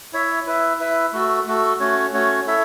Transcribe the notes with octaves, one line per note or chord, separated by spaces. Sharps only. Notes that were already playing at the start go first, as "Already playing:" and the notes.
E4 C#5 E5
E4 B4 E5
E4 B4 E5
A3 F#4 A4
A3 F#4 A4
A3 C#4 F#4 C#5
A3 C#4 F#4 C#5
E4 A4 C#5 E5